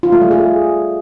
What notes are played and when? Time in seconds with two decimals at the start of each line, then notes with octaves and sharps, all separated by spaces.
0.03 F4
0.12 A3
0.22 G3
0.31 G#4